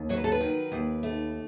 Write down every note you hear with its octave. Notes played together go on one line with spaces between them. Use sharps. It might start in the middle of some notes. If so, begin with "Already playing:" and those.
Already playing: D#2
F#3 C#5
B4
A4
B4
D#3
D#2
A3